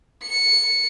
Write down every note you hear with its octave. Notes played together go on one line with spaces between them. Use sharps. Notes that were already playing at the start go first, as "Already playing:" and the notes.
C#7